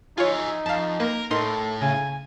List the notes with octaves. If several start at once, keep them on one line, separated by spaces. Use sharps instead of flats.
D#4 F4 G#4 C#5 E5
F2 F5 A5
A#3 A#4 B4
A2 D#4 A4 A#4 C6
C#3 G#5